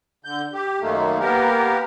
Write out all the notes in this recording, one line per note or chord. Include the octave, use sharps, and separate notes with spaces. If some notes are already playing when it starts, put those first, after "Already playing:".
D3 G6
G4
F#2 D#3 A3 A#3
A#3 B3 G4 A#4